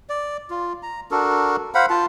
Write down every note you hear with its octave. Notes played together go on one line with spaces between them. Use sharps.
D5
F4
A#5
D4 F#4 A4 A#4
C5 F5 F#5 B5
F4 A5